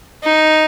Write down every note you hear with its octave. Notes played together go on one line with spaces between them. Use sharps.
D#4